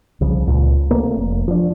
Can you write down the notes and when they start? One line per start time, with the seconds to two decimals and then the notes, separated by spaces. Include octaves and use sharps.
0.21 C2 C#3 F3
0.47 C#2 A#2
0.91 C3 A3 A#3
1.17 F1
1.48 F3 D4